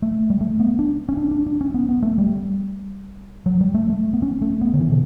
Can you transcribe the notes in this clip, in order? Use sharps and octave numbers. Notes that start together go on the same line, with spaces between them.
A3
G3
A3
B3
D4
C#4
D4
D4
D4
C#4
B3
B3
A3
G3
F#3
G3
A3
A3
B3
C#4
A3
B3
D3
E3
B2